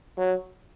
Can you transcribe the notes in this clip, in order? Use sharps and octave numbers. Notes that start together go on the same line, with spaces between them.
F#3